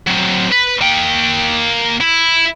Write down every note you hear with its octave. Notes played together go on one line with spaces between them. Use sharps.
F#3 C4
B4
A#3 G5
E4